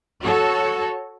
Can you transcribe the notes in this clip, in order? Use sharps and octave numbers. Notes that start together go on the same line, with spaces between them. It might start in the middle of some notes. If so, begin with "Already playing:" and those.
F#4 A4 C#5